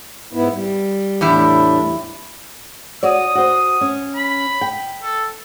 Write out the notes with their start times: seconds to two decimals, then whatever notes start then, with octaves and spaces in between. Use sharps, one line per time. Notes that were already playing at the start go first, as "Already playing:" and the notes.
0.33 G#2 B3 E4
0.51 G3
1.21 E2 A2 G3 D4 E4
3.03 F#4 C#5 D5 D#6
3.35 F#4 C5
3.81 C#4
4.16 B5
4.61 G5
5.03 A4